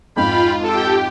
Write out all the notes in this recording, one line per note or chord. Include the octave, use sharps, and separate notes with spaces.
F2 G#2 F4 F5 G5 B5
G4 A4 G5